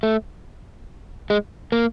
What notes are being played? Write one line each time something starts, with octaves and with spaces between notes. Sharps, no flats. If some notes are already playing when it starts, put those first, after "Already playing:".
A3
G#3
A#3